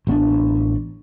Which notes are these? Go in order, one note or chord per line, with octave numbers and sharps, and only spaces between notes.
A1 B3 D4